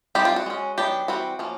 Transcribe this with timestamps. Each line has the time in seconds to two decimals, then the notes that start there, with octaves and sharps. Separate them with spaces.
0.15 G3 C4 D#4 G4
0.25 F4
0.36 F#4
0.46 G#3 C#4
0.78 D#3 F#3 B3 D4 G4
1.08 E3 G3 C4 F#4
1.39 F3 A#3 C#4